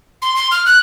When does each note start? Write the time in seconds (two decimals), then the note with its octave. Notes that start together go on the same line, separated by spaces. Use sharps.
0.22 C6
0.36 C6
0.51 F6
0.66 F#6